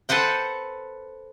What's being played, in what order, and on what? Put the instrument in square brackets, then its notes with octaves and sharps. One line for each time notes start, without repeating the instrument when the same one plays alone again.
[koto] A4 B4 C5 F#5 G5